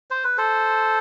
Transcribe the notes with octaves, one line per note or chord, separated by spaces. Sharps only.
C5
B4
A4 C5